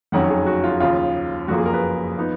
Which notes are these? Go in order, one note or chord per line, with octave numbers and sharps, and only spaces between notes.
F#1 F2 D#3 F#3 C#4 F#5
G#4
F#4
F4
D#2 C#3 F3 F4
F#1 F2 F3 A#3 F#4
G#4
A#4
B4
F3 B3 D#4